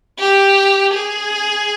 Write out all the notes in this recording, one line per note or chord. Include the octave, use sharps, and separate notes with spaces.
G4
G#4